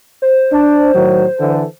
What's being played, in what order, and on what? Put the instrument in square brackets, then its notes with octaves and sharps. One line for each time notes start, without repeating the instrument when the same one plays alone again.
[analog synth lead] C5
[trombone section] D4
A2 D#3 F#3
D3 E3 A4